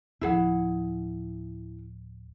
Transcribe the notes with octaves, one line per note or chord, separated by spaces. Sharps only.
D1 F3 E4 G#4 F#5